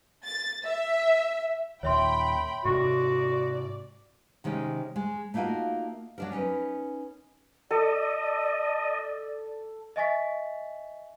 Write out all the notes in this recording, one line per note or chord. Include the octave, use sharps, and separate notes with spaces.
A6
E5
D#2 A#2 C#5 E5 G5 B5 C6
G#2 C3 F#4 D5
C3 D#3 G#3 C#4 D#4
G#3
A3 A#3 D#4 F4 F#4 A#4
F#3 D4 A#4
C#4 D#4 A#4 B4
A4 D5 D#5
D#5 E5 G#5 C#6 A6 B6